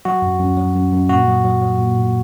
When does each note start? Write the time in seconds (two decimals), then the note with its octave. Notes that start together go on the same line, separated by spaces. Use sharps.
0.05 F#3 F#4
0.22 F#2
0.40 F#2
0.57 F#3
0.75 F#2
0.93 F#2
1.09 A#2 F#4
1.28 F#3
1.45 F#3
1.62 F#3
1.79 A#2
1.98 A#2